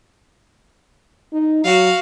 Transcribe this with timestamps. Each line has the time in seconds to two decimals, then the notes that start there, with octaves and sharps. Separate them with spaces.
1.33 D#4
1.65 F#3 F#4 F5